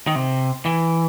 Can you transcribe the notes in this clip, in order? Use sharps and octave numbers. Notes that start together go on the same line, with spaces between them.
D#3
C3
E3